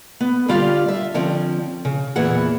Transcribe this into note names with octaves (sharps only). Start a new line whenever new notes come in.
B3
D3 G3 F4 G4 D5 F5
E5
D3 F3 C4 C#4
C#3
E2 A#2 E3 G#4 F#5